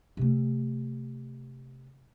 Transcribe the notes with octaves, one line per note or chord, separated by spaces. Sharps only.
C3 A3